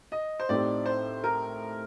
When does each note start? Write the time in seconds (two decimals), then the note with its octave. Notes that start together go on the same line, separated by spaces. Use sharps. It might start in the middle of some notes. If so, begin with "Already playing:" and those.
0.12 D#5
0.40 C5
0.49 A2 A3 C4 D#4 G4 D5
0.86 C5
1.24 A#4